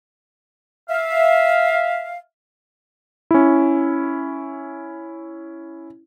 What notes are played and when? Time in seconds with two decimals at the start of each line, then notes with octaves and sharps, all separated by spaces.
0.89 E5 F5
3.31 C#4 E4